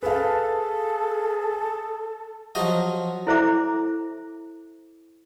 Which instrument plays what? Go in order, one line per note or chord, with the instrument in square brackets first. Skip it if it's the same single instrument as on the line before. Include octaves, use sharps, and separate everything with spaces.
[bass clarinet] G#4 [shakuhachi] A4 [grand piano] B4 F5
[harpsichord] F3 F#3 D#5
[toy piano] E4 A4 C5 E5 A#5 D6